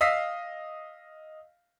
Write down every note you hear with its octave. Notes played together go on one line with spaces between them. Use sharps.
D#5 F5 D#6 E6 B6 C7